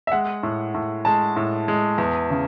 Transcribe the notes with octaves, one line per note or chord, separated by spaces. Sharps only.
E5
G#3 F#5
A2
A2
G#3 A5
A2
G#3
E2
C#3